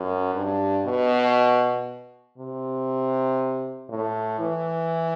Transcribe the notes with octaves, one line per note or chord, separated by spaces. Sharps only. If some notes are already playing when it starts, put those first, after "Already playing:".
Already playing: F#2
G2
B2
C3
A2
E3